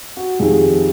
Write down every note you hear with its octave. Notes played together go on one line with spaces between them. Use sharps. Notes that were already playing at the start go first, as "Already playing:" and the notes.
F#4
F2 C3 D#3 G#4